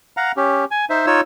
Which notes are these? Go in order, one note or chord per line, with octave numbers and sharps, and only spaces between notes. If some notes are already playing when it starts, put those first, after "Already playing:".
F5 F#5 A#5
C#4 G4
G#5
D#4 C5 E5
D#4 F4 C#5 E6